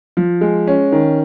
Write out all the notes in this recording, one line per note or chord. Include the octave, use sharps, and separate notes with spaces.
F3
G#3
C#4
D#3